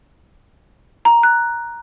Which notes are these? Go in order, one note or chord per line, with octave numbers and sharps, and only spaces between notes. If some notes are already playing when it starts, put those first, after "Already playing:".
A#5
F#6